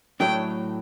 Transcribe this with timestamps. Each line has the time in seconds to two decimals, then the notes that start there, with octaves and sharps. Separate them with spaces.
0.20 A2 F#3 A3 D4 G5